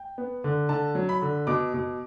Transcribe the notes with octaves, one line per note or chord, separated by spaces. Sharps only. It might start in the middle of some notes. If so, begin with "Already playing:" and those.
Already playing: G5
B3
D3
D3 A5
F#3
B5
D3
B2 D6
B2